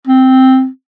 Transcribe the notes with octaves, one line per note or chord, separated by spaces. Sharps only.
C4